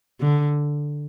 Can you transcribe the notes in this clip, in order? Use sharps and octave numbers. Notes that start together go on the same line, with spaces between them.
D3